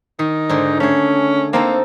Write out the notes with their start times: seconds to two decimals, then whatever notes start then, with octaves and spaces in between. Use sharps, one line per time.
0.19 D#3 D#4
0.49 G#2 D3
0.80 A3 C#4 G#4
1.53 A#3 C4 D#4 A4